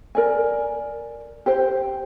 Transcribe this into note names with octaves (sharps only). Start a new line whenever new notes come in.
A#4 D5 G#5
G4 C5 G5